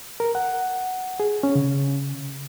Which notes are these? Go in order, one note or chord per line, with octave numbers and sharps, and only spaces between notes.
A#4
F#5
G#4
C#4
C#3